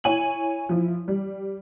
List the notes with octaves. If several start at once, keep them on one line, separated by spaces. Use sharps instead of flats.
E4 C#5 G#5 F#7
F3 E4
G3